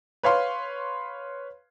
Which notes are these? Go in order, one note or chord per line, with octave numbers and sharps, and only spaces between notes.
B4 C#5 F5 C6